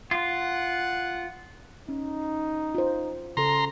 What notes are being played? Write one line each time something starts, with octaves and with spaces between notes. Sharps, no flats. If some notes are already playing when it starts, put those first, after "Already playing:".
F4 F#5
C#4 D#4
F4 C5
C#3 A4 A#5 C6